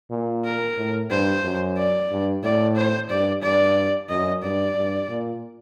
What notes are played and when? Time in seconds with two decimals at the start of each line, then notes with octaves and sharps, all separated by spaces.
0.11 A#2
0.45 A#4
0.77 A2
1.10 G2 C5
1.44 F#2
1.77 D5
2.11 G2
2.43 A2 D5
2.76 C5
3.09 G2 D5
3.42 G2 D5
4.09 F#2 D#5
4.43 G2 D5
4.76 G2
5.09 A#2